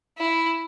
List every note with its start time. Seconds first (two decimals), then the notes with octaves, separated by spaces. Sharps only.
0.18 E4